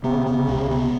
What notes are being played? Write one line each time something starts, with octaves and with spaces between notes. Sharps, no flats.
C3 B3
C#3
C3
C#3 B3
C3
C#3
C#2 C3
C#3
C3 B3